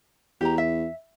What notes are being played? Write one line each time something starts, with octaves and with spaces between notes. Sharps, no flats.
E2 G4 A#5
E5